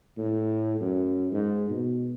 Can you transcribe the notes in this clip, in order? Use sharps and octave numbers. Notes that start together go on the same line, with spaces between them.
A2
F#2
G#2
B2